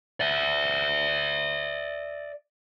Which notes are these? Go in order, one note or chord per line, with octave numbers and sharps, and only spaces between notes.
D5 E5